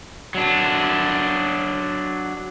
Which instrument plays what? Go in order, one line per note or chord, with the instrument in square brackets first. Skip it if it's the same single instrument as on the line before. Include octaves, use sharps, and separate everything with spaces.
[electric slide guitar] F#3 D4